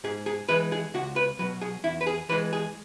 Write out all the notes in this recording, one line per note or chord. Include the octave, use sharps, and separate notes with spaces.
G#2 G#4
G#4
E3 G#3 B4
G#4
C#2 F#4
B4
B2 F#3 B4
G#4
E2 E4
B4
G#4
E3 G#3 B4
G#4